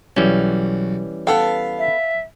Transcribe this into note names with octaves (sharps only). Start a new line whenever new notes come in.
B1 E3 G3 C#4
B3 A4 F5 G5
E5